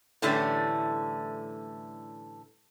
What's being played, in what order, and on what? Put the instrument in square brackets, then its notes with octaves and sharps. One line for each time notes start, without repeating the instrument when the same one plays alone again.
[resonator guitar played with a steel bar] A2 D3 E3 G3 A3 C#4